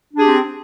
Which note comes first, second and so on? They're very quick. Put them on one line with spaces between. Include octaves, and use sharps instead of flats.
D4 G#4 G4 C4